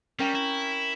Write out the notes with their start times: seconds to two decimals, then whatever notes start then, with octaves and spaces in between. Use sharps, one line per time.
0.19 G3 C#4 A#4 G5
0.35 E4